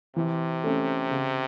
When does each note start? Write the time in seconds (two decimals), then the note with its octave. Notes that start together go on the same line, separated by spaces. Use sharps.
0.16 C3 E3
0.64 A3 C#4
1.11 C#3